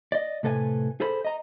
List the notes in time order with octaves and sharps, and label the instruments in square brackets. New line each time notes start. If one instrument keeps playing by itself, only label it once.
[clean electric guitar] D5 D#5
A2 C3 A4 B4 D5 G#5
G#4 A4 C5 B5
D#5 A#5